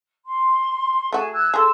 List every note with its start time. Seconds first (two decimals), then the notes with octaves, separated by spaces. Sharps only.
0.25 C6
1.13 A3 F#4 G#4 G#5 A5
1.32 E6 F#6 G#6
1.54 G#4 A4 C6 E6